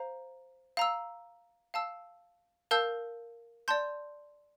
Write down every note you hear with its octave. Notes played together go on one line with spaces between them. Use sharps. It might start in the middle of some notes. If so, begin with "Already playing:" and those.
Already playing: C5 F5 A#5
F5 A#5 E6
F5 A5 E6
A#4 F5 A5 E6 G6
D5 A5 C6 G6